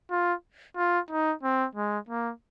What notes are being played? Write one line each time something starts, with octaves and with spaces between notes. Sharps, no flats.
F4
F4
D#4
C4
G#3
A#3